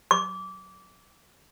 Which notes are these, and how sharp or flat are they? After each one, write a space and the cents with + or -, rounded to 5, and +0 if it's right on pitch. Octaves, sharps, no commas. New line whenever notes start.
D6 -20